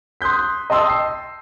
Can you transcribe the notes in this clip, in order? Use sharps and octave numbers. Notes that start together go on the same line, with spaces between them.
C6 D#6 F#6 G6 B6
D#5 G5 A5 C6 D#6 E6
C7